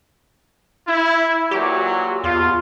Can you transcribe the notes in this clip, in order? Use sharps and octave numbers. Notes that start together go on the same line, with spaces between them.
E4
A#2 E3 F#3 G4
E2 F4